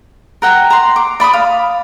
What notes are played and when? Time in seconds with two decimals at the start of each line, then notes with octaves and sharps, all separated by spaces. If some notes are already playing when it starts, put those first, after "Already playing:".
0.42 A#4 F#5 G5 A#5
0.70 A#5 C6
0.96 D6
1.20 D5 B5 C#6 D#6
1.33 F5